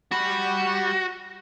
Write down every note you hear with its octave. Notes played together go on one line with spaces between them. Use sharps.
G3 F#4 B5